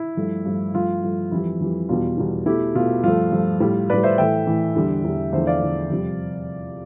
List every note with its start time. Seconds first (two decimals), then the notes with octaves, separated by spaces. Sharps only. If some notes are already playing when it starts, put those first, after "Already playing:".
Already playing: E4
0.17 G2 F3 A3
0.46 G2 F3 A3
0.74 G2 F3 A3 F4
1.03 G2 F3 A3
1.31 F2 E3 G3 E4
1.60 F2 E3 G3
1.89 E2 B2 G3 F4
2.18 E2 B2 G3
2.46 B2 A3 E4 G4
2.75 B2 A3 F4
3.03 G2 F3 A3 F4
3.32 G2 F3 A3
3.60 A2 G3
3.90 A2 G3 B4 D5
4.03 C5 E5
4.18 A2 E3 A3 E5 G5
4.46 A2 E3 A3
4.75 E2 D3 G3
5.04 E2 D3 G3
5.32 E2 D3 F3 A3 C5 E5
5.47 D5 F5
5.62 E2 D3 F3 A3
5.90 F2 C3 G3